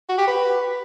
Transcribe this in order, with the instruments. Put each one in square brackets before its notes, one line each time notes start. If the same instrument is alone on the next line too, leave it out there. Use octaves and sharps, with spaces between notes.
[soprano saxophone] F#4
G4
B4